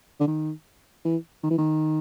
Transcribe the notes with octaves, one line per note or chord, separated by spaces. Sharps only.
D3
D#3
E3
D#3
E3
D#3